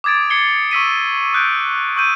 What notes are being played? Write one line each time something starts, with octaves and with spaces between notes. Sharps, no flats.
D6 D#6 G#6 A6 D7
D6 G#6 C7 C#7 G7
C#6 E6 B6 D#7
D#6 F#6 G6 D7
C#6 E6 G6 D#7